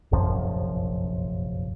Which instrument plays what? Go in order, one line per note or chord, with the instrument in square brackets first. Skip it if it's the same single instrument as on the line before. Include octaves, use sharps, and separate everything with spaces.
[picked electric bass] F1 A#1 F#2 F3